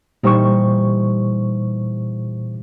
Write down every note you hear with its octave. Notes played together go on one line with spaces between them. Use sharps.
A#2 E3 G3 D#4 C5 C#6